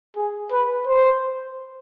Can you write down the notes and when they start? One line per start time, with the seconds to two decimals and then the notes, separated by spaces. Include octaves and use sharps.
0.16 G#4
0.51 B4
0.87 C5